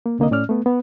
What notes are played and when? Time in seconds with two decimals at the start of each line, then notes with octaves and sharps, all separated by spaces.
0.06 A#3
0.19 C2 D3 A#3 C4 D#5
0.31 A2 C#4 D5 F6
0.49 A3 B3
0.66 B3